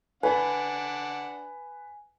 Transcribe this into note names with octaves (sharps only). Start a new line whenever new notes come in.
D4 B4 F#5 G#5